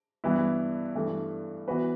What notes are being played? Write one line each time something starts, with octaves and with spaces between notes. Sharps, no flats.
G2 E3 G3 B3 E4
G2 E3 A3
E3 B3 F#4 B4